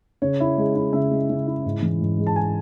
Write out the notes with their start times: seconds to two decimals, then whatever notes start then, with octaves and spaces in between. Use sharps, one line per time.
0.22 C#3 C#5
0.40 E4
0.57 G#3
0.75 E4
0.93 C#3 E5
1.11 G#3
1.29 C#3
1.47 E4
1.65 G#2
1.82 E3
2.01 G#2
2.18 G#3
2.27 A5
2.36 G#5